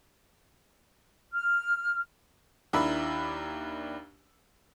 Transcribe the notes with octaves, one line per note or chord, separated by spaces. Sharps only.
F6
D#2 D4 E4 A#4 B5 E6